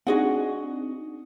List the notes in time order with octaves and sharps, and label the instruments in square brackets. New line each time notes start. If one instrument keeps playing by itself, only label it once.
[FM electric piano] C4 D4 D#4 [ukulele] F#4 G#4 F#5